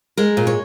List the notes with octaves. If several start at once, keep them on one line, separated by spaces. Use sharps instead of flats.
G#3 A#4
A#2
C#5